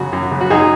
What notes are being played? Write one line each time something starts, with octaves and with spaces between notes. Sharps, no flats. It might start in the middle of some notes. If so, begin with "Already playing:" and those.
Already playing: F#2 C#3 F#4
F#2
C#3
F#4
F#2 D#4 G#4